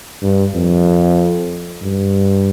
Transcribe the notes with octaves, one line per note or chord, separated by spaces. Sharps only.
G2
F2
G2